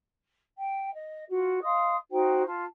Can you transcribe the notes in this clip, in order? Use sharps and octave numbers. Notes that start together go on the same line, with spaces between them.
G5
D#5
F4 F#4
D#5 F5 C6 D#6
D#4 F#4 C5 G5
F4 A5